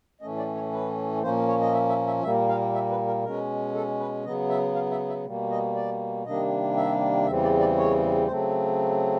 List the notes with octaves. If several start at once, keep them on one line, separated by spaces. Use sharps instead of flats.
A2 E3 A3 C#4 D#5
D5
C#5
B4
A#2 F3 A#3 C#4 C5
C#5
D#5
E5
E5
E5
A#2 G3 A#3 E5
F5
E5
B4
A#4
B2 G#3 C#4 A#4
A4
B4
C#3 F#3 B3 D#5
E5
F5
E5
E5
B2 G3 A#3
D#5
D5
C3 D#3 G3 A#3 D4 D#5
E5
E2 C#3 E3 G3 C4 E5
D5
D5
C#5
C#3 F#3 A3 C4 C5